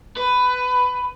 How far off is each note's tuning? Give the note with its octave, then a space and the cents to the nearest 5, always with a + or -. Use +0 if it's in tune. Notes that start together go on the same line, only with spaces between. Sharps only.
B4 +15